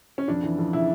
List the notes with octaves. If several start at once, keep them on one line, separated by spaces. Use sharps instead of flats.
C#4
F2 D4
E3
F2
C#3 E4